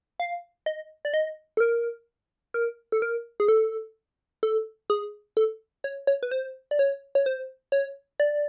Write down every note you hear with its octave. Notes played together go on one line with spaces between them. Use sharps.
F5
D#5
D5
D#5
A4
A#4
A#4
A4
A#4
G#4
A4
A4
G#4
A4
C#5
C#5
B4
C5
D5
C#5
C#5
C5
C#5
D5